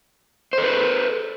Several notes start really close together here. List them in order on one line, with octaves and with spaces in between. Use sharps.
C5 A4 B4